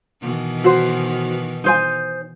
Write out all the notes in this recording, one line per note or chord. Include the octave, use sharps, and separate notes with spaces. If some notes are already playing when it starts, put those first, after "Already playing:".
B2 D#3 E3
F#4 C5
D#4 C5 G#5